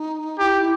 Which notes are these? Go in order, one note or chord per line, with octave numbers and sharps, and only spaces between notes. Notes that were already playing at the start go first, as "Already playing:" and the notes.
Already playing: D#4
E4 G4
E4